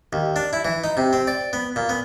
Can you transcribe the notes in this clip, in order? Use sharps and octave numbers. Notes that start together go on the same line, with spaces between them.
D#2
D4
E4
E3
D#4
C3
C4
D5
B3
A#2
B3